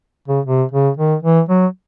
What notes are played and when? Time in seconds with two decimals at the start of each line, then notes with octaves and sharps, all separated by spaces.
0.28 C#3
0.45 C3
0.71 C#3
0.97 D#3
1.23 E3
1.49 F#3